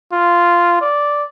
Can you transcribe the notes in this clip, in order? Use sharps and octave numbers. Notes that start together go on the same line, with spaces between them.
F4
D5